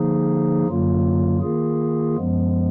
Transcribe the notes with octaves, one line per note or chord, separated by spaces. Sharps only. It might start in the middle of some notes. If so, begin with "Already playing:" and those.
Already playing: D3 F3 A#3 D#4 G#4
F#2 D3 F#3 A#3 F4
D#3 A#3 F4 G#4
F#2 F3 G#3 B3